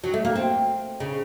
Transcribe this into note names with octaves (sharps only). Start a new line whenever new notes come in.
F#3
A3
A#3
C4
C#3